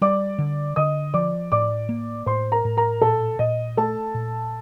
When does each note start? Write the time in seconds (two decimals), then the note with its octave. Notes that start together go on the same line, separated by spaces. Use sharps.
0.01 G3 D5 D6
0.38 D3
0.76 D3 D#5 D#6
1.14 F3 D5 D6
1.52 A2 D5 D6
1.89 A#3
2.26 A2 C5 C6
2.52 A#4 A#5
2.65 A2
2.77 A#4 A#5
3.01 A#2 A4 A5
3.39 A#2 D#5
3.77 A3 A4 A5
4.14 A#2